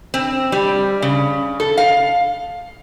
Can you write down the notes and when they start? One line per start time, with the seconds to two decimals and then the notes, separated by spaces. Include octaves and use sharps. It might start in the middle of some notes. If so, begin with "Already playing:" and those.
0.14 C4
0.52 G3
1.02 C#3
1.60 A4
1.77 F5